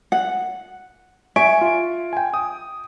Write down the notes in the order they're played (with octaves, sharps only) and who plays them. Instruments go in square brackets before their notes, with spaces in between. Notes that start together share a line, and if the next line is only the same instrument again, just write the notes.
[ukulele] F#5
[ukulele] E5 [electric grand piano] G#5 C#6 D7
[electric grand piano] F4
G5 G#5
D#6